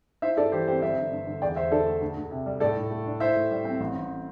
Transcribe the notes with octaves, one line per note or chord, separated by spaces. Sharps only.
E4 C5 E5
G2 A4 D5
E3 G4 C5
C4 G4 C5
G1 C5 E5
G1
G2
D3
E2 D5 G5
E2 C5 E5
D3 A4 D5
A3
D2
D2
C3
G3
A2 A4 D5
A2
A3
D4
E4 C5 E5
A2
G3
C4
A1
A1